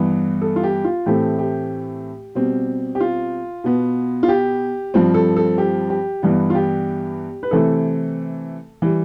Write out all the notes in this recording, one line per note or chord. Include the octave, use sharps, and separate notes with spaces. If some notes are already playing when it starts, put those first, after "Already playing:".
Already playing: G2 E3 B3
A4
F4
G4
F4
A2 E3 A3 C4 G4
G4
B2 G3 C4
G4
F4
B2 B3
F4
G4
G2 F3 C4
A4
A4
G4
G4
G2 E3 G3 B3
F4
G4
B4
C3 E3 A3 C4 A4
E3 G3